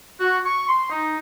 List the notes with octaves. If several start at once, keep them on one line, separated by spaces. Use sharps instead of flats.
F#4
C#6
C6
D#4